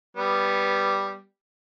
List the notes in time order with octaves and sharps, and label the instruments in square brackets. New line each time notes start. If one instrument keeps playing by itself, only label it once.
[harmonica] G3 B3